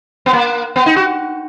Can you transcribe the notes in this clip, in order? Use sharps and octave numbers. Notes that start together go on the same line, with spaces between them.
B3
A#3
B3
D#4
F#4